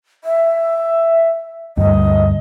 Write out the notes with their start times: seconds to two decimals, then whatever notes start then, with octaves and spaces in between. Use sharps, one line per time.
0.24 E5
1.77 D2 G2 D#5